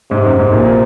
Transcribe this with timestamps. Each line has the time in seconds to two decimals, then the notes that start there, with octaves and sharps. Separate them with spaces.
0.11 G#2 C3
0.25 F#2
0.39 G#2
0.52 A#1 A#2
0.65 A#2